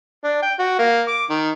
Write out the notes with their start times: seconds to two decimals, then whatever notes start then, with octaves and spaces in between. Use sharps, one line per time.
0.24 D4
0.42 G5
0.59 F#4
0.79 A#3
1.08 D6
1.30 D#3